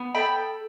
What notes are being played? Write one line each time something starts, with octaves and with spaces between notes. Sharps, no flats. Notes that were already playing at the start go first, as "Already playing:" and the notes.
Already playing: B3
A4 G5 B5